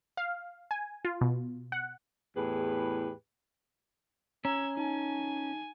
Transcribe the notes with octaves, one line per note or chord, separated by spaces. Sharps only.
F5
G#5
F4
B2
F#5
E2 A2 G4 G#4 B4
C#4 A#5 E6 G#6
D#4 G#5 A5